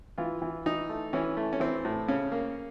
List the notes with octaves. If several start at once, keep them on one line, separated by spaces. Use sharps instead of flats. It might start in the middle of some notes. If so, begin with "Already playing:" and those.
E3 F4
E3
E3 D#4
A3
E3 C#4
A3
C#4
E3 C4
A2
C#3 C#4
A#3